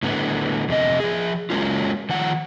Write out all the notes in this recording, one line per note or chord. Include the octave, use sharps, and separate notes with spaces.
A2 D3 B3
F2 C3 D#5
F3 G#4
F#3 G#3 A#3 C#4 F4
D#3 F3 F#5